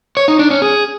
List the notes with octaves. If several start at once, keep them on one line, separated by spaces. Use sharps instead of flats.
C#5
D#4
D4
C#4
G#4